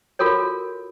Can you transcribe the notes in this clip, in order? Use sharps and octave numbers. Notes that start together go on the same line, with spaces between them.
F4 F#4 A4 A#4 C#5